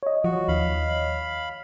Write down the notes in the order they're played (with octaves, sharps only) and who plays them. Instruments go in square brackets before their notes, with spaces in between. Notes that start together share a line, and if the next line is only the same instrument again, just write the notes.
[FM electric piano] C#5 D#5
[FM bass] F3 [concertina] F#4
[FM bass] D#2 [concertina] F5 B5